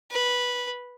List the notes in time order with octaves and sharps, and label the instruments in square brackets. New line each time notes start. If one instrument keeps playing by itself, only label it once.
[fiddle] B4